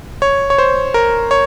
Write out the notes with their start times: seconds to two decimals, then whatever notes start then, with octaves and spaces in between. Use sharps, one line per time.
0.22 C#5
0.50 C#5
0.58 C5
0.94 A#4
1.31 C#5